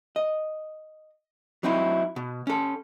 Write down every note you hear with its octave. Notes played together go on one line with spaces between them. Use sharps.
D#5
F#3 C4 D#4 E4
B2
C#4 A4